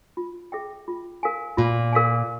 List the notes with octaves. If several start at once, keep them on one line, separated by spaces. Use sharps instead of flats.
F4
G#4 E5 G5
F4
A#4 F5 G#5
A#2 F4
A#4 F5 G#5